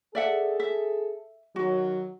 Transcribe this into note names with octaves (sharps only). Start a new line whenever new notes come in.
G#4 A4 D5 E5 F#5
E5
D#3 F#3 F#4